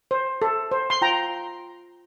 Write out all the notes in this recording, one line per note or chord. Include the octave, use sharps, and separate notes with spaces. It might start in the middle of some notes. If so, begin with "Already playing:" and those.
C5
A4
C5
C6
F4 G5 A#5